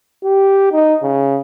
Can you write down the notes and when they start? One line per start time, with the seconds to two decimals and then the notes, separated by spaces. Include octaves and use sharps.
0.24 G4
0.72 D#4
1.02 C#3